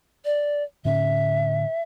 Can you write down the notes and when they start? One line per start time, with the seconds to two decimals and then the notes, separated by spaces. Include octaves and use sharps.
0.25 D5
0.85 A2 D3 C#4 E5